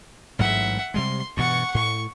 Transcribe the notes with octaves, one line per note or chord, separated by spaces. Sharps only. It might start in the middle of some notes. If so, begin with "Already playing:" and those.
A1 G#2 F#3 E5 F#5
C3 G3 G#3 C6
G2 B2 E3 F#5 C#6
A2 C#6